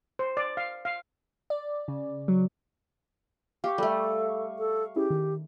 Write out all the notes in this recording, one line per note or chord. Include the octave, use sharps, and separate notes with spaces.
C5
D5
F5
F5
D5
C#3
F#3
G4 F5 C#6
G3 A3 A4
A4
C#4 E4 G4 G#4
D#3